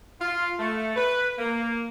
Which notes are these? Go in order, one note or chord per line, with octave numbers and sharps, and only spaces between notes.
F4
A3
B4
A#3